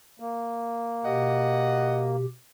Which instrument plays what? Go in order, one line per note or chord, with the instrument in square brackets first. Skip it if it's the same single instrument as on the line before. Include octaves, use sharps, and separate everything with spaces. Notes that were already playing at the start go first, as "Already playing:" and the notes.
[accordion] A#3
[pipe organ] B2 G4 [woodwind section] D#5 F#5